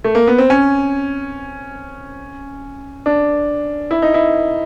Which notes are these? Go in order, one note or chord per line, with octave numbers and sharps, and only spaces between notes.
A3
A#3
B3
C4
C#4
D4
E4
D#4
E4